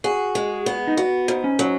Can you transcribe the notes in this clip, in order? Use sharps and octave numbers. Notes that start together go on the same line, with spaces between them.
F#4 G#4
G#3
B3
D#4
B3 F#4
G#2
C#4
F#3